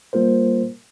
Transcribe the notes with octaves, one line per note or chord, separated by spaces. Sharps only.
G3 A#3 F4 A#4 C5